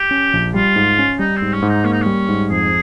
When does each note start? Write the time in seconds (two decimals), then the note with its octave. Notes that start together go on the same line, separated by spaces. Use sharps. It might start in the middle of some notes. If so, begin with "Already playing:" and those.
Already playing: G4
0.11 C#4
0.33 A#1
0.54 G3 F4
0.76 G#2
0.99 C#4
1.19 G3 D#4
1.36 C4
1.42 G#2
1.53 C#4
1.62 G#2
1.69 D#4
1.84 A#3 C#4
1.92 D#4
2.02 G3 C#4
2.28 G#2
2.50 F2 G#4